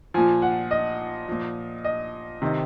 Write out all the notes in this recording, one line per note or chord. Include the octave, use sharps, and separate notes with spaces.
A#2 F3 G#5
F#5
D#5
A#2 F3
D#5
C3 D#3